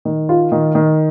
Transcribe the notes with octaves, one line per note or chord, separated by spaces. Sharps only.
D#3
F4
D#3
D#3